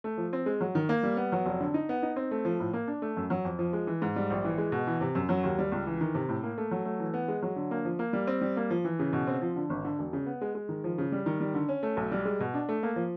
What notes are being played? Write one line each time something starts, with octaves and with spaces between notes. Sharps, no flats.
A3
F3
C4
G#3
F#3
D#3
A#3
G3
B3
F#3
F1
D3
D#4
B3
D#4
C4
A3
F3
A2
A#3
D4
A3
F#2
F#3
F2
F3
G#3
E3
G#2
G3
A#1
E3
G#3
B2
E3
C3
F#2
F#3
D#2
G3
C#2
E3
D#3
C3
A2
A#3
A3
F#3
A3
E3
B3
G#3
F#3
D3
A#3
F3
A#3
G3
C4
G3
A#3
F3
E3
C#3
B2
C4
F3
D3
G#1
D3
E1
C#3
B3
G#3
G#3
D#3
F3
C#3
G3
D#3
G3
D3
C#4
A3
B1
G3
G#3
B2
D4
A3
A#3
F3